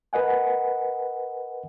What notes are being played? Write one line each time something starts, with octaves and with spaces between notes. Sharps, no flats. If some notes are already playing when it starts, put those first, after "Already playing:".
A#4 B4 D#5 F#5 G#5